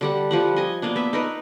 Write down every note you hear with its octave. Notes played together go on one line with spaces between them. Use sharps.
D3 G3 F#5
F3 G3 F#5
D#5 G#5
A#3 B3 D4
B3 E5
D#4 A#4 B4